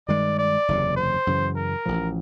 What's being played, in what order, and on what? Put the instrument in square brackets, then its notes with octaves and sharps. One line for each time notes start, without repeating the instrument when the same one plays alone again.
[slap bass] G2 D#3 G#3 [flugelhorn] D5
[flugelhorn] D5
[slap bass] F#1 E2 C3
[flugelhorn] C5
[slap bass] F#2 C#3 E3
[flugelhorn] A#4
[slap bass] A1 A2 F3